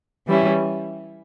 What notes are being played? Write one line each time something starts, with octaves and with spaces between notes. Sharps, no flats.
E3 G3 C#4 E4